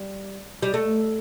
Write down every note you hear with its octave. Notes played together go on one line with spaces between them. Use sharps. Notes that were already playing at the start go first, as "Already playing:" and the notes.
Already playing: G3
G3
A3